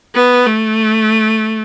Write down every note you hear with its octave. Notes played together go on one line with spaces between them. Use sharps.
B3
A3